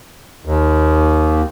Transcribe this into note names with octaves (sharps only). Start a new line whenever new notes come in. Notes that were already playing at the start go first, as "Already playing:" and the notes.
D#2